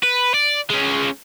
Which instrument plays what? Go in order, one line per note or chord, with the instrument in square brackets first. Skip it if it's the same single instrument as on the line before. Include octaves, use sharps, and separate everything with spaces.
[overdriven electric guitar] B4
D5
G#3 C#4